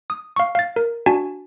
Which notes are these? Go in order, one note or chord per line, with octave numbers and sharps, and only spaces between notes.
D#6
F5 C#6
F5 A6
A#4
D4 F#4 G#5 A5